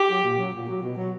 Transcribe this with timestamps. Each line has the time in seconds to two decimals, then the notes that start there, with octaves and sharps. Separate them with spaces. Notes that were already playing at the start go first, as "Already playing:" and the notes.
Already playing: G4
0.08 F#3
0.23 A#2
0.38 F#3
0.53 A#2
0.68 F#3
0.82 B2
0.97 F#3